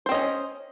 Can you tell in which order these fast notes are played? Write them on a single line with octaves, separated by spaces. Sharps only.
C5 C4 D#5 C#4